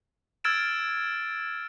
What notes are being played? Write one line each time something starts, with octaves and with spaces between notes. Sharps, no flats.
E6 F6 G#6 A6 D7 E7